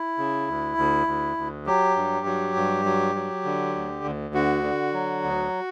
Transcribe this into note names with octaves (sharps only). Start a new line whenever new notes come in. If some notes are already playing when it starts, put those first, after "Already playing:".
Already playing: E4
C#3
D2
D2
D2
D2
F#3 G4
G2
F#3
G2
F#3
F#3
D3
D2
D2
D3 F#4
D3
F#3
D2